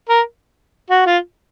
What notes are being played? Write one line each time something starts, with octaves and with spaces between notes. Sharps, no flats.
A#4
F#4
F4